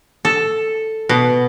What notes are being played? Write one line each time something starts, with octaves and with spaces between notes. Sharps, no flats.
A4
B2